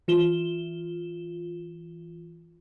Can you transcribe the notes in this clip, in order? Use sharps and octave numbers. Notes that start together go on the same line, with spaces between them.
E3 F4 E7 G7